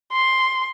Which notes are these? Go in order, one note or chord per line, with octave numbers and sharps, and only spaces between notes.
C6